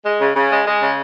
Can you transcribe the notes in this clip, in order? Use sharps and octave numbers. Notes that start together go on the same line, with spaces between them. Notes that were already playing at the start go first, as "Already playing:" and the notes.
G#3
C#3
C#3
G#3
G#3
C#3